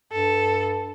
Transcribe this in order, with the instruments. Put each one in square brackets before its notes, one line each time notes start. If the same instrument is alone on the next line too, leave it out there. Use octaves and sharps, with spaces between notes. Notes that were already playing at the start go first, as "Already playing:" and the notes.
[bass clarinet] G2 [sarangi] A4